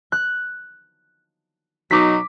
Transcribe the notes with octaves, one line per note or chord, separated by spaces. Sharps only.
F#6
B2 F#3 D#4 D6 B6